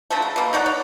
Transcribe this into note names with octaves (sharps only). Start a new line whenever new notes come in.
D3 F3 F#3 A3
C#3
B2 A#3
D#4 C#5 D5 F#5
C#5